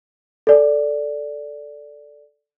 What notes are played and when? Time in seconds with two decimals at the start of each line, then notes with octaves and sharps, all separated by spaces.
0.47 A4 D5